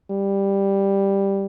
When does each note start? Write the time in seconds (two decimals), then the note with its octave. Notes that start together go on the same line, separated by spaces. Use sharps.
0.11 G3